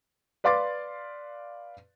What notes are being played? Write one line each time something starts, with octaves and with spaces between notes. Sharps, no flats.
B4 D5 F5 C6 D6 A6